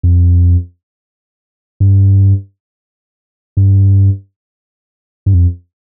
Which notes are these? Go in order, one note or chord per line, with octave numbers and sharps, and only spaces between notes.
F2
G2
G2
G2
F2